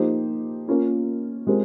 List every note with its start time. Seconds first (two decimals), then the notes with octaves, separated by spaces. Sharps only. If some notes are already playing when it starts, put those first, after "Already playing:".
Already playing: F3 A#3 D#4 G4 C5
0.68 A#3 C#4 F4 A#4
1.47 G#3 C4 G4 A#4